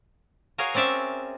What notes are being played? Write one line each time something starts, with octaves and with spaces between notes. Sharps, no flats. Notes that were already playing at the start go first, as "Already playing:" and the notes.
F#4 G#4 A#4 C#5 F5
C4 C#4 D5 E5